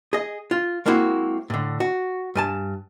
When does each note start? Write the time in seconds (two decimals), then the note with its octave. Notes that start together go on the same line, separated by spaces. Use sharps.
0.13 G#4 D#5
0.51 F4
0.86 G#3 A#3 C4 E4 F#4
1.50 A2 D3
1.80 F#4
2.35 G2 G#5 A5